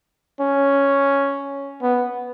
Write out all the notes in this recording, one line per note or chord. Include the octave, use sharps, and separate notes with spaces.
C#4
B3